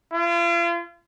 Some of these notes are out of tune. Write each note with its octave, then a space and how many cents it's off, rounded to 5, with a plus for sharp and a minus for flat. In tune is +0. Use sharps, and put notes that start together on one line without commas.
F4 -40